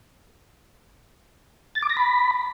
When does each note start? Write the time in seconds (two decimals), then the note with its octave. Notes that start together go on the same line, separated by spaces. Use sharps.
1.75 A6
1.82 D6
1.90 A#6
1.97 B5